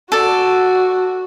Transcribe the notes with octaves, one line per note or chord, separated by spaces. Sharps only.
F#4 A4 D5